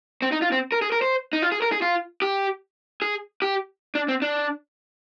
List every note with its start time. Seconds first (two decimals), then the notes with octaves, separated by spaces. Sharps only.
0.22 C4
0.32 D#4
0.42 F4
0.52 C4
0.72 A#4
0.82 G#4
0.92 A#4
1.02 C5
1.33 D#4
1.42 F4
1.52 G#4
1.62 A#4
1.72 G#4
1.82 F4
2.22 G4
3.02 G#4
3.42 G4
3.95 D4
4.08 C4
4.22 D4